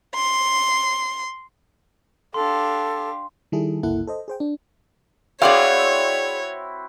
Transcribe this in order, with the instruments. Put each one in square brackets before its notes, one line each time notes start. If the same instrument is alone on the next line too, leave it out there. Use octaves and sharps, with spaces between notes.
[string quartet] C6
[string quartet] D4 G4 F5 [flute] A4 [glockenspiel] C6
[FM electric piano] D#3 G3 E4 G#4 A4
G1 C#2 A#3 E4 A4 F#5
A4 C5 D#5
G#4 C5 G5
D4
[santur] C4 E4 F#4 [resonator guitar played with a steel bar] G#4 D5 F5 [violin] C#5